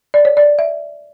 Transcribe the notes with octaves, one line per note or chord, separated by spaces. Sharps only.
D5
C#5
D5
E5